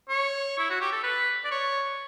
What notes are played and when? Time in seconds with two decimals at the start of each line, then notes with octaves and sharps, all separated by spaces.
0.09 C#5
0.58 E4
0.70 F#4
0.81 G4
0.92 A4
1.03 B4
1.44 D5
1.51 C#5